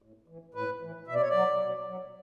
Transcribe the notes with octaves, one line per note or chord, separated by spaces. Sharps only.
A2
E3
A2 B4
E3
B2 E5
D5
C#5
F#3 D5
B2
F#3